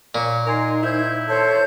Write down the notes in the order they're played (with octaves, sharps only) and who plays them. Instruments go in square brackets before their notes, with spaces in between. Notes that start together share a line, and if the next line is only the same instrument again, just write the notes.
[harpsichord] A#2 [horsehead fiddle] C#5
[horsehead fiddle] D#4 [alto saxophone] A#4 [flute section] G#5 C6
[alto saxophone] E4 [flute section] C5 G6 G#6
[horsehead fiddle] A4 C5 [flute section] C#5 A5 G6